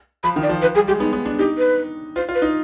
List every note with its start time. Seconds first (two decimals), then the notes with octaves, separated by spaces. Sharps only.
0.24 F3 B5
0.36 D#3
0.43 D5
0.49 F3
0.62 F3 B4
0.75 G3 G#4
0.88 G#3 G4
1.00 B3 D#4
1.13 B3
1.25 D4
1.39 D#4 G4
1.58 B4
2.16 F4 C5
2.29 F4
2.35 B4
2.42 D#4